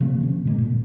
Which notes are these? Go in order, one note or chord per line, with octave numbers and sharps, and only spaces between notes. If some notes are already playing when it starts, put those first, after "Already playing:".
C3 F3 A#3 C4
D3 C#4
A#2 G#3 A#3
A#2 D3